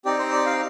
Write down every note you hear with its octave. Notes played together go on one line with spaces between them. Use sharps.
C4 D#4 G4 D5
C5
D5
F5